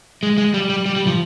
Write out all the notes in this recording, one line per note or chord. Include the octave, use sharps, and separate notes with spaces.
G#3
G#3
G3
G3
G3
G3
F3